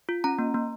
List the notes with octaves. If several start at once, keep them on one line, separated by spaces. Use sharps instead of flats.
F4
C#4 A#5
A#3
A#3